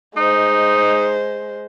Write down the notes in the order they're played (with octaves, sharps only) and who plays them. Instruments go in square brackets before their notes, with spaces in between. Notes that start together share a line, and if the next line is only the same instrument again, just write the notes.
[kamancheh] G#3 C5 [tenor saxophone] D#4